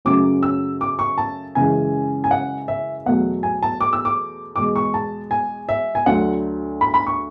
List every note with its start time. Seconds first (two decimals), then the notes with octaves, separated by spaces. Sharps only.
0.05 F#2 C#3 F#3 A3 D6
0.43 E6
0.81 D6
0.99 C#6
1.18 A5
1.55 F#2 C#3 E3 G#3 G#5
2.24 G#5
2.31 F#5
2.68 E5
3.05 E2 B2 F#3 A3 F#5
3.43 G#5
3.63 A5
3.81 D6
3.93 E6
4.05 D6
4.56 E2 B2 G#3 D6
4.76 C#6
4.94 A5
5.31 G#5
5.69 E5
5.95 G#5
6.06 D2 D3 F#3 A3 F#5
6.81 B5
6.94 B5
7.07 C#6